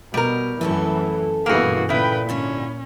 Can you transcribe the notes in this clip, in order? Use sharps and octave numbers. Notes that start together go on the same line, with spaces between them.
B2 G3 A#4 D#5
F#2 E3 A3 C#4 A4
G2 B2 E3 A#3 E4 F#4 G#4
A#2 C#3 E4 B4 G5
G#2 D3 C#4 F#4